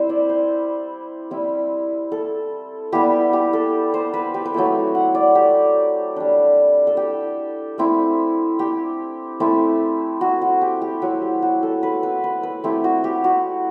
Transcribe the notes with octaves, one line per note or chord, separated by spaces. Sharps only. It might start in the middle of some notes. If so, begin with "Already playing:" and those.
Already playing: G3 C4 E4 C5
D5
C5
G3 C4 E4
A4
G3 B3 E4 G4
G4
A4
C5
B4
G4
B4
F#3 A3 C4 E4 A4
F#5
D5
G4
G3 D4
A4
G4
A3 C4 E4
G4
A3 C4 E4
F#4
F#4
G4
G4
F#3 C4 E4 F#4
G4
F#4
A4
B4
B4
B4
B4
A3 C4 E4 G4
F#4
G4
F#4